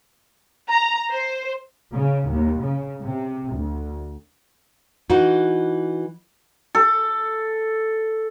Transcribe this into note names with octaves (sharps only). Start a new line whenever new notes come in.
A#5
C5
C#3
D#2
C#3
C3
D2
E3 D#4 F#4
A4